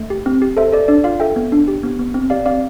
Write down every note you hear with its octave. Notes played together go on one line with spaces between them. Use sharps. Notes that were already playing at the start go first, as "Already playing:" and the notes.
Already playing: A3
G4
C4
G4
A4 C5 E5
A4 D5
D4 D5
F4 D5 F5
A4 E5 G5
B3
D4
G4
B3
B3
C4
G4 D5 F5
C4 D5 F5